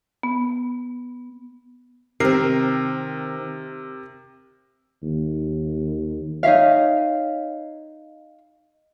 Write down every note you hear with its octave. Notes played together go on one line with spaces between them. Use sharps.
B3
C3 D#3 C4 A#4 C7
D#2
D#4 C#5 E5 F5